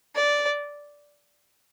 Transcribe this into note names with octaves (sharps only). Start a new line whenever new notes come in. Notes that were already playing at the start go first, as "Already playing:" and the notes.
D5